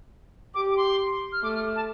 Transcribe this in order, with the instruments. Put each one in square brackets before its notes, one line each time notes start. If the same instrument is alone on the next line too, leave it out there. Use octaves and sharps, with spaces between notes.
[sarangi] G4 [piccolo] D6
[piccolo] D6
C6
F6
[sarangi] A3 [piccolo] D6
[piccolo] F6
A5